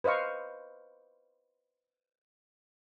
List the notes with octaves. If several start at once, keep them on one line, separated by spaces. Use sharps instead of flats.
B4 C5 D#5 F5 C#6